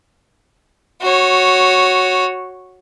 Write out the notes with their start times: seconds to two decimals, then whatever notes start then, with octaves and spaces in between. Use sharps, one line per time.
1.02 F#4 C#5